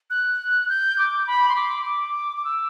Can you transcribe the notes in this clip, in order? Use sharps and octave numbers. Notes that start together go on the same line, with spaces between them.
F#6
G6
D6
B5
C6
D6
D6
D6
E6